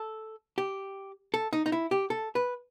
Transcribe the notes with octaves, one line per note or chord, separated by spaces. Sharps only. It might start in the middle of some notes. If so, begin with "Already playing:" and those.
Already playing: A4
G4
A4
D#4
D#4
E4
G4
A4
B4